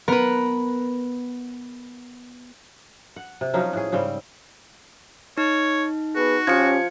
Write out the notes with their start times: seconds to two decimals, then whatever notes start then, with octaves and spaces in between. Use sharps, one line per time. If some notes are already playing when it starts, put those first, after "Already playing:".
0.08 B3 A#4 B4
3.16 F#5
3.41 C3
3.54 F3 F#3 C#4 D#4
3.73 A2 G#4
3.92 G#2 C#3 G3 C4
5.38 D#4 C#5
6.15 B3 F#4 G#4 B4
6.47 F3 C#4 G4 G#6 C#7